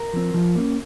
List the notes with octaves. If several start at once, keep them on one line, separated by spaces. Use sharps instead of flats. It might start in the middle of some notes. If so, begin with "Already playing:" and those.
Already playing: A#4
F3 C4
F3
A#3 C#4